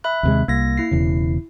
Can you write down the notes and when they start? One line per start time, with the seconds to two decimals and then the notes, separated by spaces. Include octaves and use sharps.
0.04 E5 B5 F#6
0.23 D#2 C3 G#3
0.48 C2 A#3 A#6
0.77 E4 C7
0.91 E1 E2 C#3